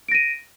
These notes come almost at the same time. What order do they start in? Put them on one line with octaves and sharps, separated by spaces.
D7 A#6 D#7